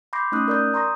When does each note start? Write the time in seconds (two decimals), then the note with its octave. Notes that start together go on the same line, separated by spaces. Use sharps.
0.13 B5 C6 D6 G6 A#6 C7
0.32 A3 C#4 D#4 D#6 F#6
0.48 A#4 D5 D#6 G6
0.74 A#5 C6 C#6 D#6 A#6